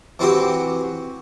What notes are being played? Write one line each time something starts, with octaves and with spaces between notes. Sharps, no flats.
E3 C4 E4 F#4 G4